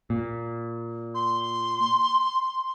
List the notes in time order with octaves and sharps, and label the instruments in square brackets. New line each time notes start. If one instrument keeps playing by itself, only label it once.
[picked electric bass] A#2
[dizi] C6